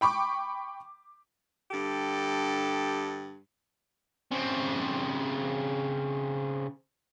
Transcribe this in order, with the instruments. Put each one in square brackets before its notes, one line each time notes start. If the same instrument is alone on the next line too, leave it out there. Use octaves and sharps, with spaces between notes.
[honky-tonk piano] G5 B5 C#6 D6
[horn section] G2 D3 G4 A4
[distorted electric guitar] C#3 C4